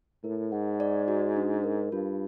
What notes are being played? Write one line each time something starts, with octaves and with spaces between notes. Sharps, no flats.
A2 A#4
G#2 F#5
D5
F#4
D4
A#4
G2 F4